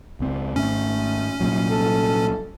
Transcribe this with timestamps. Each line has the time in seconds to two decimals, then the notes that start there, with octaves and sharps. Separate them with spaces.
0.20 C#2 C4
0.56 G#1 A3 C#4
1.40 C2 A#2 F#3
1.70 A4